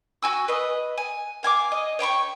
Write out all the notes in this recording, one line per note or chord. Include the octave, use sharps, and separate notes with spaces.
F#4 G#5 E6
B4 D#5
G#5
F5 G#5 A5 D6
D#5
C#5 G5 B5 C#6